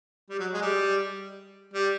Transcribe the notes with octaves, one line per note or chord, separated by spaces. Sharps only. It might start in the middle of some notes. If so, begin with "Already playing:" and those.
G3
F#3
G#3
G3
G3